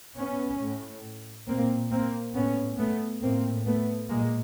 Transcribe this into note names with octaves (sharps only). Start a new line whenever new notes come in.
B3 C#4
A2
A#2 A#3 C4
A#3 C4
A2 B3 C#4
A3 B3
A2 A#3 C4
A3 B3
A#2 G#3 A#3